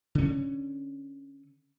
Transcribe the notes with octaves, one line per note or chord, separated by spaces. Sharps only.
D3 C#4